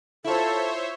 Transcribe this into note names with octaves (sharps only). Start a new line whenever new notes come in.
E4 F4 A4 C5 C#5 E5